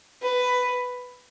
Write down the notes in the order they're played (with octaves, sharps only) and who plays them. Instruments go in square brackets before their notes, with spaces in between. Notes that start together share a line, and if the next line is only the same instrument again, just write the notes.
[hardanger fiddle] B4